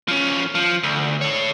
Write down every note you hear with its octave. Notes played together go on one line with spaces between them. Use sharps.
F3 C#4
F3
D2
A4 C#5